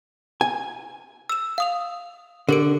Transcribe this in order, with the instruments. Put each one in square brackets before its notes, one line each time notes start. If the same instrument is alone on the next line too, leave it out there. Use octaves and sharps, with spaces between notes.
[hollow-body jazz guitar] G#5
[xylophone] E6 E7
F5 D#6 F7
[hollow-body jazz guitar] D3 [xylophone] G4 A#4 D7